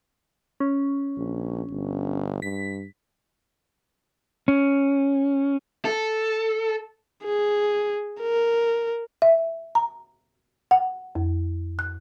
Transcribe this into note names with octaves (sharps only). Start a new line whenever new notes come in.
C#4
A#1
G1
G2 B6
C#4
A4
G#4
A#4
E5
A#5
F#5
F2
F#6